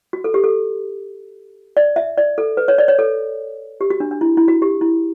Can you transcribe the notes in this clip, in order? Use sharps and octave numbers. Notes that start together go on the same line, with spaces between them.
F#4
A4
G4
A4
D5
E5
D5
A4
B4
C#5
D5
C#5
A4
G4
F#4
D4
D4
E4
E4
F#4
G4
E4